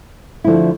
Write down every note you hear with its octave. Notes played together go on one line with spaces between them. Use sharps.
D3 F3 A3 E4